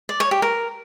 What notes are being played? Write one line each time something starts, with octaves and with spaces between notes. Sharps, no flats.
D5
C#5
G4
A#4